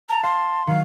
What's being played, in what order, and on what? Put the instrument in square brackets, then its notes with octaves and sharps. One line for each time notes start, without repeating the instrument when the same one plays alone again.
[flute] A5 [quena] A#5
[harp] F5 [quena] C6
[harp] D#3 F#3 [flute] F5